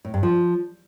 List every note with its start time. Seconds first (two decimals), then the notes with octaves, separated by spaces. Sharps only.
0.05 A2
0.14 G2
0.23 F3